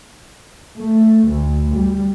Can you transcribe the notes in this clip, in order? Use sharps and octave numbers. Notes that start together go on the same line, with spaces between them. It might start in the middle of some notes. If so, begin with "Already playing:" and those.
A3
D2
G3